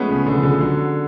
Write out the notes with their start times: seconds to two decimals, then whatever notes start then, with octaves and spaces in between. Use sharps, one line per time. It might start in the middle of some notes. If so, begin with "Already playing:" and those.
Already playing: F3 G#3 A3 B3 C#4
0.09 C#3
0.26 D3
0.36 F3
0.43 D3
0.61 D3 F#3